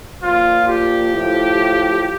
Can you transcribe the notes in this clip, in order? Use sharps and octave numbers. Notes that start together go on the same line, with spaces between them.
A#2 F3 F4
G4
A2 F3